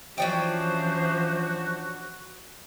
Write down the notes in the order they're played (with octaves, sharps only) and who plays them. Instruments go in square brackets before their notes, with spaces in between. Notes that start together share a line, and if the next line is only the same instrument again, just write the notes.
[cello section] E3 F3 [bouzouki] C#4 D4 G5 [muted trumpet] F#4 [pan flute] C5